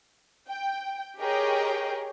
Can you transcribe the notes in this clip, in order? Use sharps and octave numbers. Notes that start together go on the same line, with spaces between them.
G5
G4 G#4 A#4 C#5 D#5 G5